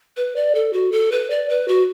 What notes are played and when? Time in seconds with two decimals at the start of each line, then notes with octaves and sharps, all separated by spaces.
0.17 B4
0.36 D5
0.55 A4
0.73 F#4
0.92 A4
1.12 B4
1.30 D5
1.49 B4
1.68 F#4